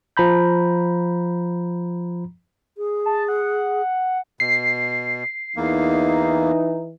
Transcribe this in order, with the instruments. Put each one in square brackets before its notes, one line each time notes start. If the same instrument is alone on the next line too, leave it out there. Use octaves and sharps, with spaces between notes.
[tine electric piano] F3 A#5 B5 G6
[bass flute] G#4
[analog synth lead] A5
F#5
[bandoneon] B2 [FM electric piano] C7
[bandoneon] E2 A#3 [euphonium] E3 [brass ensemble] D#4